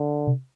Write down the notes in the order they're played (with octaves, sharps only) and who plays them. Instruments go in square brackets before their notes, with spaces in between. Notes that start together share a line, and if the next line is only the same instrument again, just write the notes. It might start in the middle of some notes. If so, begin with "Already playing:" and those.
Already playing: [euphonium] D3
[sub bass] C3